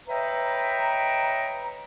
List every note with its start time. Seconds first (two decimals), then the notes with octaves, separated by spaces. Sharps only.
0.08 B4 C#5 D#5 E5 G5 A#5